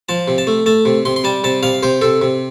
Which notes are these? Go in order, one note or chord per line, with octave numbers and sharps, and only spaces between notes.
F3 A5
C3
A5
A3
A3 A5
C3
C3 C6
C6
G3 A5
C3 A5
C3 F5
C3 C5
C3 A4
C3